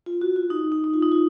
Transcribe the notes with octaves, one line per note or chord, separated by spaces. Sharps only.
F4
F#4
F4
D#4
D#4
D#4
F4
D#4
F4